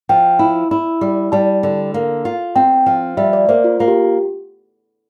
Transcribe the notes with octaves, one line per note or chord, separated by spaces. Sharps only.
F3 G5
E4
E4
G3
G3 A5
D3
A#3
F4
C4 G5
F3
G3 E5
D5
A#3 C5
F4
A#3 F4
G4